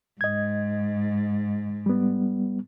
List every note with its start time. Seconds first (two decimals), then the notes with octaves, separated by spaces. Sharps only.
0.21 G#2 D#5 G#6
1.86 G3 B3